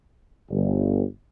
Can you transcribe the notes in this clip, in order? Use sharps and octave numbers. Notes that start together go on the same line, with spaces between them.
G1